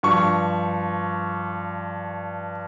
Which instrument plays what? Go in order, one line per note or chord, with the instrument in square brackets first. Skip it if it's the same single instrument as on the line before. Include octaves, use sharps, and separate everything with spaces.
[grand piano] G2 F3 C#6